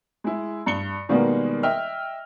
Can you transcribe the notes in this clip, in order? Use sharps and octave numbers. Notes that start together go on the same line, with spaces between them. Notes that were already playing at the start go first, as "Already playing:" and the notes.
G#3 E4
G2 C#7 G7
B2 D#3 G3 G#3 A#3 B3
D#5 E5 G5 F6